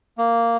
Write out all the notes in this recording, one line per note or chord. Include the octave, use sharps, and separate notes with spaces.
A#3